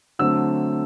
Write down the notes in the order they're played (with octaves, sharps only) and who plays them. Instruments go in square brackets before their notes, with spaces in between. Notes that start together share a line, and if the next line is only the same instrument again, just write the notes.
[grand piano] D3 F#3 A3 C4 E6